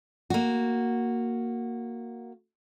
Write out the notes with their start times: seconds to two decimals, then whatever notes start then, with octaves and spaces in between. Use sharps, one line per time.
0.30 A#3 F#4